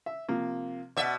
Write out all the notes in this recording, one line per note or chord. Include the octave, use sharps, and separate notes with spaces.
E5
C3 F3 A#3
B2 D5 E5 F#5